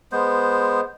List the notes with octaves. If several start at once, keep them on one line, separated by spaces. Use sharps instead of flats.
G#3 B3 C5